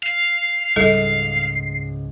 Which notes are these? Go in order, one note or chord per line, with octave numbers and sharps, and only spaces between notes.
F5 C7
C#2 G#2 G3 A4